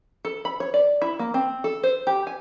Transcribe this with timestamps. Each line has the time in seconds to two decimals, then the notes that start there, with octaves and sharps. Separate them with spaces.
0.25 A4
0.45 B5
0.60 C#5
0.74 D5
1.02 E4
1.19 A#3
1.34 C4
1.64 A4
1.83 C5
2.07 G4
2.27 G#5